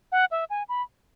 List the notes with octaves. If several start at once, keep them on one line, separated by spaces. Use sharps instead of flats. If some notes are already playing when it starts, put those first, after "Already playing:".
F#5
E5
G#5
B5